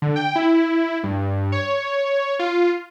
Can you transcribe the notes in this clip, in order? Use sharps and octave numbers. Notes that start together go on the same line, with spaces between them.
D3
G5
E4
G2
C#5
F4